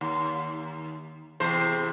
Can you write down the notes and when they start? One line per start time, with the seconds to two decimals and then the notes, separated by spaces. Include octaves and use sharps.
0.01 D#2
1.40 E2 C3 C5